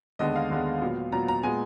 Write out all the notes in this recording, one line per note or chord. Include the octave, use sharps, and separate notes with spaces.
D#2 D3 G#3 B3 D#5
F5
D#2 D3 G#3 B3
A#2 F#3 B3
A#2 F#3 B3 A#5
A#5
A#2 G#3 B3 G#5